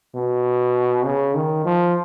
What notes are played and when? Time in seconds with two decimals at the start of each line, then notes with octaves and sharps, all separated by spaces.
0.15 B2
1.05 C#3
1.35 D#3
1.65 F3